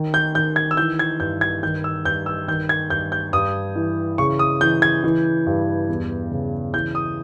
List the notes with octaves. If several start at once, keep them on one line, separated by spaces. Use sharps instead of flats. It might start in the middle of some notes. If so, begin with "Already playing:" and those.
Already playing: D#3
G6
D#3 G6
G#6
E6
E3 G6
G#6
G2 G6
G#6
D#3 G6
E6
G2 G6
E6
D#3 G6
G#6
G2 G6
G6
G2 D#6
E3
C#3 C#6
D#6
E3 G6
G#6
E3
G2
E2
C#3
E3 G6
D#6